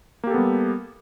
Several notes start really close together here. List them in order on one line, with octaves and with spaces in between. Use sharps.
A#3 G4 A4 B3 G3